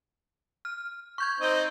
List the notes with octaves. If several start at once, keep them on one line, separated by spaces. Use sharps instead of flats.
F6
C#6 G6 G#6
C4 D#4 C5